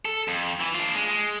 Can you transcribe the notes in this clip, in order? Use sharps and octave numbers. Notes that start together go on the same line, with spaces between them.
A4
F2
E3
D4 F4
G#3
G#3